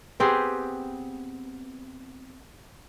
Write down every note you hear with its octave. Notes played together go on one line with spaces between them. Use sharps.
B3 C4 G4 G#4